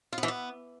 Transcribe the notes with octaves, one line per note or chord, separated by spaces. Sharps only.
F4
B3
E3
B3